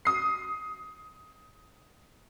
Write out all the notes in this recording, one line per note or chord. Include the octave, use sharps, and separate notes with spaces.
D#6 C7